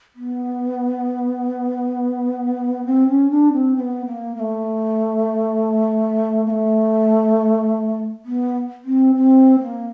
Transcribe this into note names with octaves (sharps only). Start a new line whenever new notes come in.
B3
C4
C#4
D4
C4
C4
B3
A#3
A#3
A3
A#3
A3
B3
C4
C4
A#3